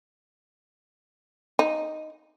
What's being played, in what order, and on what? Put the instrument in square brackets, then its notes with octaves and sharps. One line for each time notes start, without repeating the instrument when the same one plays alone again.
[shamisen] D#4